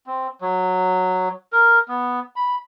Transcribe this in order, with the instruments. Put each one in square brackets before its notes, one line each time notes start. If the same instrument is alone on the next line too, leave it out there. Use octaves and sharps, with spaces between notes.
[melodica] C4
F#3
A#4
B3
B5